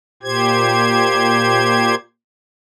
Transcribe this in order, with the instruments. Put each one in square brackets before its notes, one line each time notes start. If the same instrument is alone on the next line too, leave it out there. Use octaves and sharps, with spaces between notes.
[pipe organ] A#2 G4 C5 G#6